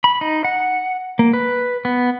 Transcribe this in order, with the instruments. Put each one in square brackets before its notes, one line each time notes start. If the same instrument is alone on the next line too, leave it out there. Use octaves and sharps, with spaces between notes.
[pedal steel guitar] B5
D#4
F#5
A#3
B4
B3